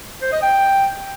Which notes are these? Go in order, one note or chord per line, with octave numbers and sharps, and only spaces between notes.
C5
D#5
G5